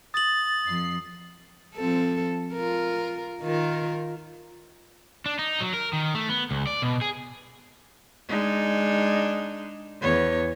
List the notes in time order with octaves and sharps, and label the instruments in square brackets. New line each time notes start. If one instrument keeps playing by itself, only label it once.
[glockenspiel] D#6 F#7 [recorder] A6
[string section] F2 C7
[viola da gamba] F3 C4 A4
F4 A#4
D#3 F4 A#4
[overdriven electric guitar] D4
D#4
F#3
A#4
D#3
A3
B3
C#2
D5
B2
G#4
[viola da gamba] G#3 D4 D#4
E2 B3 C#5